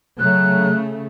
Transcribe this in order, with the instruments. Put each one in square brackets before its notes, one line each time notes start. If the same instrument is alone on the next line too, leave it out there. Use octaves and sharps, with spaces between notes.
[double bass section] C#3 A3 [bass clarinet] F#3 [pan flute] F#6